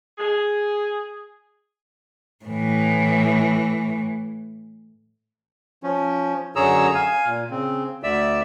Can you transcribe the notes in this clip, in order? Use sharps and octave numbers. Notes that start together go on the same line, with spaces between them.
G#4
A2 E3
F3 C#4
F#2 D3 G#4 C#5 A#5 E6
F5 G#5
A#2
C#3 C4
D2 D3 D5 E5 E6